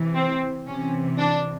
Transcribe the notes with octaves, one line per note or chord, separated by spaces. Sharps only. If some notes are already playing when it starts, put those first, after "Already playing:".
Already playing: C3 E3
C4
C3 E3 C#4
D4